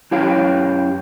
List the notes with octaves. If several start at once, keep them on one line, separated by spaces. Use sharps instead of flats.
F#2 E4 G4 C#5 F5 G5